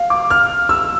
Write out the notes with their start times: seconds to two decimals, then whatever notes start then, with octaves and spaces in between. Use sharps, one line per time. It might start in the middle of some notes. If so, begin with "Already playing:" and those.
Already playing: F5
0.10 D6
0.30 F6
0.69 E6